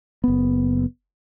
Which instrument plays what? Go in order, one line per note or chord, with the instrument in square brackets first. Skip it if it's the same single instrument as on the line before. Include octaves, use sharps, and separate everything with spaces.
[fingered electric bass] F#1 B3